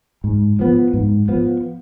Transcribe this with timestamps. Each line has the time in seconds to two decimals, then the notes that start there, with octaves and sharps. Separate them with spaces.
0.24 G#2
0.59 F3 B3
0.94 G#2
1.28 F3 B3